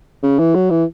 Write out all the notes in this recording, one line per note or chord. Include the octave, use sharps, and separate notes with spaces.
C#3
E3
F#3
E3